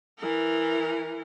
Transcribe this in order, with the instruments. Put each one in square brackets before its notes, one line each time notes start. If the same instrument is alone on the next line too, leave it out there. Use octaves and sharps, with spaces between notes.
[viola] E3 A#4